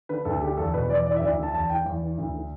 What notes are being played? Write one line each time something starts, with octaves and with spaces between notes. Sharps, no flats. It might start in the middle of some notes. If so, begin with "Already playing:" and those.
D3 B4
D2 A4
D3 G4
E2 A4
B2 B4
E2 D5
E3 D5
E5
D2 D5
D3 E5
A5
E2 A5
E3 G5
E2
E3
D2
D3